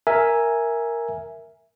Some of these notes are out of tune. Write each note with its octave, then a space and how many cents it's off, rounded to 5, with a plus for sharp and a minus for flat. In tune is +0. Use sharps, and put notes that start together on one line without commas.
A#4 +0 E5 +0 G#5 +0